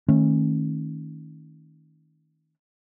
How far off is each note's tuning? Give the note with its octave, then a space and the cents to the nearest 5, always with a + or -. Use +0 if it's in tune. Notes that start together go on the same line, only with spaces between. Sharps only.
D#3 +10 A3 +10 C#4 -35